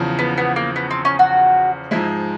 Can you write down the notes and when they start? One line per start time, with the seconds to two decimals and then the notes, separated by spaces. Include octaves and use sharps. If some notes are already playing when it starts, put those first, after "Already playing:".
Already playing: E2 C#3 F3
0.19 B3
0.38 B3
0.56 A#3
0.76 B3
0.91 C4
1.05 C#4
1.19 F#4
1.91 G#2 F3 G#3 E4